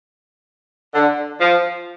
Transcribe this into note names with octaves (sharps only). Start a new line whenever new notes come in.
D3
F3